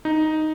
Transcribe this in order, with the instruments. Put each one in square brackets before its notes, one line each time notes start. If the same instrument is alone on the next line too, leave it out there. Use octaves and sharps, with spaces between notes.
[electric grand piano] D#4